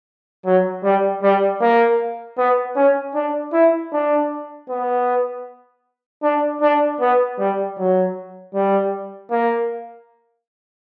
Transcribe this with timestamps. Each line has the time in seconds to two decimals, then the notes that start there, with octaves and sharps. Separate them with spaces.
0.45 F#3
0.84 G3
1.23 G3
1.61 A#3
2.37 B3
2.76 C#4
3.14 D4
3.53 E4
3.92 D4
4.69 B3
6.23 D4
6.62 D4
7.01 B3
7.39 G3
7.78 F#3
8.54 G3
9.31 A#3